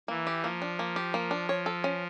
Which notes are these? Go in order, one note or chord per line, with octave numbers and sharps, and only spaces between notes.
E3 A#3
G4
F3 A#3
D4
A#3
G4
A#3
D4
C#5
A4
C#4